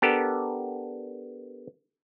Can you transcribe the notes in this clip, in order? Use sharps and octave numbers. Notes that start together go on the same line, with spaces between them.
B3 D4 G4 A4 A#4